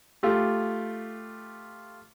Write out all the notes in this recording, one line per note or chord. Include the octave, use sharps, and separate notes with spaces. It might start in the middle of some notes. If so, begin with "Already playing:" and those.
A3 F4 G4